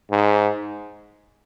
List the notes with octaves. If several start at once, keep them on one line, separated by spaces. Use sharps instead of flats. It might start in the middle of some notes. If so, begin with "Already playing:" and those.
G#2